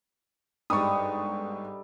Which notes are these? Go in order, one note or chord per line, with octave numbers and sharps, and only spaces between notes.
G1 G#2 G3 D#4 A4 C#6 D#6